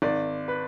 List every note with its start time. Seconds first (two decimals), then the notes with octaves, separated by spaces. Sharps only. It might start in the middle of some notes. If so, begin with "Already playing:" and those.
0.02 G#1 D5
0.48 B4